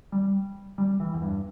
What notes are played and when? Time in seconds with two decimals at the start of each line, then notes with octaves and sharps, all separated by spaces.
0.12 G3
0.78 G3
1.00 E3
1.14 E2
1.22 G2